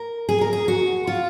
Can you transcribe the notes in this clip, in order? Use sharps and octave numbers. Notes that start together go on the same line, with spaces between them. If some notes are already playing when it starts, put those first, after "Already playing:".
Already playing: A#4
G#4
A#4
G#4
F#4
F4